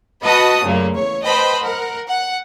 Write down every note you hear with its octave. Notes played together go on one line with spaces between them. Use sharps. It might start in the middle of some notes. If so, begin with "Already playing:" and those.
F#4 B4 D#5 A5 B5 D#6
F#2 A#2 C#3 A3 A#3
E2 C#5
B4 C5 D#5 G5 A5 B5
A#4 F#5
F#5